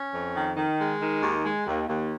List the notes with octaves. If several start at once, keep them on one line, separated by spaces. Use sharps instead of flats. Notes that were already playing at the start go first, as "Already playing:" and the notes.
Already playing: C#4
F2
D#3
D#3
G#3
D#3
D#2
G#3
D#2
D#2